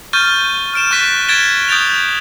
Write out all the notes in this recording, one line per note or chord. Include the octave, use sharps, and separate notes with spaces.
C#6 F6 G6 A6 D#7
F6 D7 E7
C#6 F#6 A6 B6
G#6 A6 D7 E7 G7
D#6 G6 A6 D7 F7